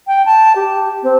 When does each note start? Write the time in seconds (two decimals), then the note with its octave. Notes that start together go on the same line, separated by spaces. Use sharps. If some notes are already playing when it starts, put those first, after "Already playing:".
0.07 G5
0.26 A5
0.56 G4
1.03 C4